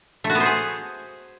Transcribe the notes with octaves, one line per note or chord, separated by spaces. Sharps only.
A3
F#4
B3
C5
G#4